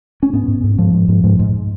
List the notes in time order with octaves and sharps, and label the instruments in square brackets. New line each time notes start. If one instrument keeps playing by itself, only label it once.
[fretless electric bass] C#4
G#2 B3
G#2
G#2
G#2 F3
G#2
G#2
G#2
G#2